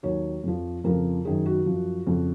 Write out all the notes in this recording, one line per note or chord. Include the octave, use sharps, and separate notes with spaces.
D#2 D#3 F#3 C#5
F2 F3
F2 C#3 F3 A#4
F#2 D#3 F#3 G#4
F#4
F#2 F3
F2 C#3 F3